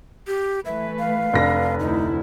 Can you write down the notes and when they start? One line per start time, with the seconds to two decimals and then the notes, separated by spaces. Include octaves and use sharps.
0.27 G4
0.66 E3 A3 B4 E5
0.99 F5
1.33 F1 D4 B4 A#6
1.80 D2 D#4 E4